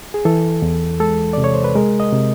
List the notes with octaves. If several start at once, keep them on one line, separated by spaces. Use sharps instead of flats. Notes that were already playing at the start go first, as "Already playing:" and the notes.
G#4
E3 A4
E2
G#3 A4
C3 D5
C#5
C5
B4
G#3 A#4
D#5
C3